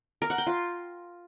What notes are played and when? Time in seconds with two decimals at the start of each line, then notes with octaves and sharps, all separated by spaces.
0.22 A#4
0.30 F#5
0.38 G5
0.47 F4